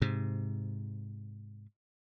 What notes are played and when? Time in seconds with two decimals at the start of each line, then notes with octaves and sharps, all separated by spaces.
0.02 G#2 C3